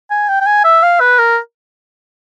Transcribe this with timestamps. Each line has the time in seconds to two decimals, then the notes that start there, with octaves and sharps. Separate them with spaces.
0.10 G#5
0.28 G5
0.40 G5
0.46 G#5
0.64 E5
0.82 F5
1.00 B4
1.18 A#4